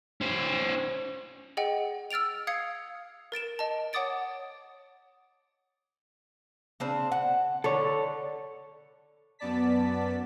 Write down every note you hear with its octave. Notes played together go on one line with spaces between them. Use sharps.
C#4 C5
G#4 D#5 F#5 G5
E6 F6 A6 D7 F7
F5 D#6 G#6 C7 C#7
A#4 A6 D7 E7
D#5 A5
C#5 F#5 D6 D#6 A6 D7
C#3 C4 D4
F#5
D3 A4 C#5
F#2 B3 D5 A5 B6